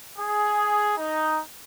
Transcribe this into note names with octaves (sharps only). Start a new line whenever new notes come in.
G#4
D#4